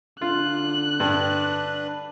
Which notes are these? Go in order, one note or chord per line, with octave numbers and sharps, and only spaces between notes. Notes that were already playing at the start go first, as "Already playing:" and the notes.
D3 F4 F#6
G2 D4 B4